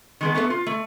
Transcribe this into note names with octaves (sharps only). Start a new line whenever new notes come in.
D#3 G#3 B3
A3 B3 A4 C5 E5
F4
A3